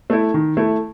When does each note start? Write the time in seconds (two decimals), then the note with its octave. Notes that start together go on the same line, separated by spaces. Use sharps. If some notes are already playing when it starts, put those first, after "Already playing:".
0.10 A3 E4
0.34 D#3
0.57 A3 E4